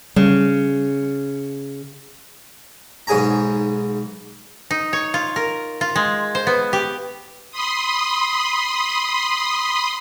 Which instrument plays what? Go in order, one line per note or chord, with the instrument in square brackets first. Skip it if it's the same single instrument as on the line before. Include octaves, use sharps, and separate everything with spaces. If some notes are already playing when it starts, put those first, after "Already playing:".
[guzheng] C#3 [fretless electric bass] G3
[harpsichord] B1 G#2 G#4 G#5 A#5
[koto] D#4
C#5
F4
A#4
F4
G#3
C5
B3
G4
[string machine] B5 C6 D#6